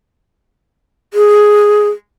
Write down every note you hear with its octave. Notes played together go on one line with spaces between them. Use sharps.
G#4